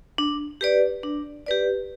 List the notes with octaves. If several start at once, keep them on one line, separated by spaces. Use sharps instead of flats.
D4
G4 B4 D5
D4
G4 B4 D5